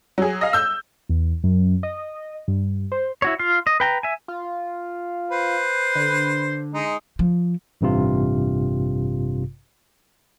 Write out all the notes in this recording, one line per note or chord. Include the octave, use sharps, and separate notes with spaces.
F#3 G#4
D#5 F5
E6 G6
E2
F#2
D#5
G2
C5
E4 F#4 C#5
F4 F5
D#5
B4 G5 A#5
E5 G#5
F4
B4 C5
D3
G#3 D#4
F3
A1 G2 C3 F4